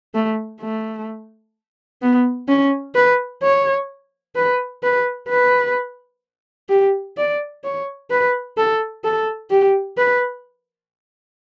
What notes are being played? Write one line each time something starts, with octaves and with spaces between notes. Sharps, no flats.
A3
A3
B3
C#4
B4
C#5
B4
B4
B4
G4
D5
C#5
B4
A4
A4
G4
B4